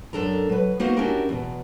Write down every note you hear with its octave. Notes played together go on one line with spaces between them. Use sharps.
F#2 D4 A4 A#4 A#5
F#3 B4
A#3 B3 D#4 F#4 C5 F5
C#4 D4 E4 F#4 G4 A#4
E2 B2